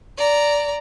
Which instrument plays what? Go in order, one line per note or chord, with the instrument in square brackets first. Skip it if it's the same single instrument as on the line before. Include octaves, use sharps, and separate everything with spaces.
[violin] D5 A#5